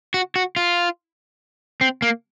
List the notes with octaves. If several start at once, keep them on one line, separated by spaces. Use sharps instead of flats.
F#4
F#4
F4
C4
A#3